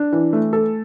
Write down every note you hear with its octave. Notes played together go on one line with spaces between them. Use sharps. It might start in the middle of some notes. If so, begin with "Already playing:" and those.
Already playing: D4
E3
A3
A4